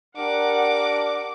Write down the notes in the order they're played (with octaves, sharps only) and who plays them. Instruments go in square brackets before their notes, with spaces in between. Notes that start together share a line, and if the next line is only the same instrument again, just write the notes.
[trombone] D4 [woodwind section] G4 A#4 [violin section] F#5 [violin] D6